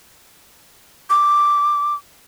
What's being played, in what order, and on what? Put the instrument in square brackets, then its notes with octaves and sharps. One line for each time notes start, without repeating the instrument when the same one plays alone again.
[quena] D6